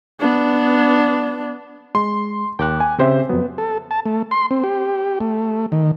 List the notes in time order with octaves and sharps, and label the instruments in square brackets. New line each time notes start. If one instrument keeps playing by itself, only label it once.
[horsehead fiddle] B3 D4
[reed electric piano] G#3 [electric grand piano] C6
[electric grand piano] D#2 [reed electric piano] G5 D6 F#6
[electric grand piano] G#5
[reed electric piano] C#3 G4 G#4 [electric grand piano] C4 C5 E5
[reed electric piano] F2 F#3 [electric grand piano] B3
[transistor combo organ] A4
A5
A3
C6
C4
G4
A3
D#3